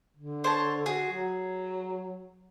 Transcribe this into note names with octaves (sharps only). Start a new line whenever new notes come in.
D3
C5 C#5 A5
F#4 G#4
F#3